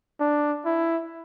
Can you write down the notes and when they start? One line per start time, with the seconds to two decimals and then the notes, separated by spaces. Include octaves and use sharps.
0.20 D4
0.65 E4